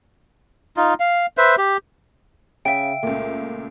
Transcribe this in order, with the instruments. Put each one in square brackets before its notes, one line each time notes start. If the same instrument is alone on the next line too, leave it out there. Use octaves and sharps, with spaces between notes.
[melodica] D#4 F4
F5
B4 C5 E5
G4
[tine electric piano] C#3 [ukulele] E5 G5 [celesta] F5 D7
[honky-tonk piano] C#2 A#2 [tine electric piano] A3